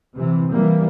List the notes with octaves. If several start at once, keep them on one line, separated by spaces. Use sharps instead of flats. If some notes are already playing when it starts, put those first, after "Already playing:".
C3 E3
E3 G3 A#3